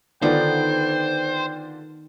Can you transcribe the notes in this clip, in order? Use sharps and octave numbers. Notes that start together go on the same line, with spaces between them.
D3 D#3 B3 F4 C5 D5 G5